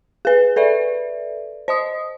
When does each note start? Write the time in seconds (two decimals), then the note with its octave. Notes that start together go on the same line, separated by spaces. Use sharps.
0.25 G#4 B4
0.56 A4 B4 D5 E5
1.68 C5 D#5 D#6